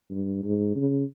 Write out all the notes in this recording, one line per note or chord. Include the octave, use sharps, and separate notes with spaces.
G2
G#2
C#3